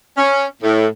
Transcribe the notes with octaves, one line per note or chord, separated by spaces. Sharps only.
C#4
A2